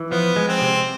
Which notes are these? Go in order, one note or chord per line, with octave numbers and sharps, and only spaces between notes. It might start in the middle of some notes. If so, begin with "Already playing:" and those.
Already playing: E3
F3 B3
G#3
C4
C3